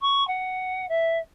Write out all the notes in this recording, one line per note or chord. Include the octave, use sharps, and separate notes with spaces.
C#6
F#5
E5